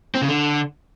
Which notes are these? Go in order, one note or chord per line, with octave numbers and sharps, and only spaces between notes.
C4
C#3
D3